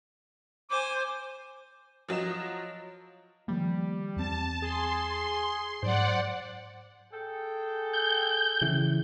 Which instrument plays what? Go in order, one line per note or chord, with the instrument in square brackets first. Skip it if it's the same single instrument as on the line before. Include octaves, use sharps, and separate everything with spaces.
[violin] C5 G#5 [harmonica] D6
[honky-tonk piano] F3 F#3 D#5 E7
[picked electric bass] D#3 F3 A#3 [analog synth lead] G3
[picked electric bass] E2 C4 [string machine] A5
[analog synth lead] G#4 [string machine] C6
[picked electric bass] G#2 F#3 [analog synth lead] C5 [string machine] D5 F#5
[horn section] G#4 A4 G5
[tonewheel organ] G6
[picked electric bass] C#3 E3